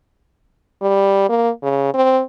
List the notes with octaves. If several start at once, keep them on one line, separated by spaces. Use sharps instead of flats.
G3
A#3
C#3
C4